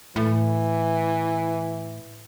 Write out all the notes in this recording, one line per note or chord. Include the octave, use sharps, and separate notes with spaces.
A2 E3